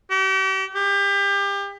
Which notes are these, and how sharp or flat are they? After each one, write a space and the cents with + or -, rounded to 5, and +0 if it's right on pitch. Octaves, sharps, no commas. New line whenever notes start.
G4 -40
G4 +30